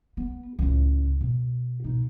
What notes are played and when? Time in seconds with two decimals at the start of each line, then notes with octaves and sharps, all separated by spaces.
0.17 B3
0.59 C#2 A2
1.21 B2
1.84 B2 D#4